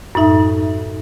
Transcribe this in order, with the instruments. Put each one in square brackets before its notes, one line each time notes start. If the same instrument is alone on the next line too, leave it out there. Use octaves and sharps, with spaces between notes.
[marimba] F#2 A2 D#4 E5